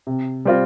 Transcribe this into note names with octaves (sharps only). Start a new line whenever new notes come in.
C3
G3 C4 F4